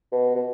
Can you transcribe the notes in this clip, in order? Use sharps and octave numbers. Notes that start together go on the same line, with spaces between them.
B2
B2